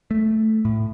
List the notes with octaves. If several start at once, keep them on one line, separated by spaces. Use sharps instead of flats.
A3
A2